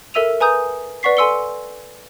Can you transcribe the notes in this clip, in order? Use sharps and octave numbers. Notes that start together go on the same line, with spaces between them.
A4 A#4 E5 E6 D#7 F7
B4 G#5 A#5 D#6 G6
B4 D5 F#5 C#6 B6 C7
A4 G#5 C6 E6 C#7 G7